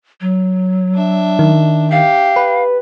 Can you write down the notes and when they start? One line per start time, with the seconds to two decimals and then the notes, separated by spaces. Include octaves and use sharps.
0.21 F#3
0.94 D4 E5
1.39 D#3
1.91 G4 F5
2.36 B4